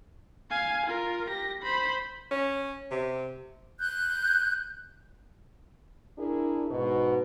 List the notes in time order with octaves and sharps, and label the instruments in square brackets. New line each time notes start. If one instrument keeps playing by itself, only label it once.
[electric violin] F5 G#5
F4 A#4
G4 A#6
C5 B5
[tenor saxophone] C#4
C3
[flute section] F#6 G6
[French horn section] D4 E4 G#4 A#4
G#2 B2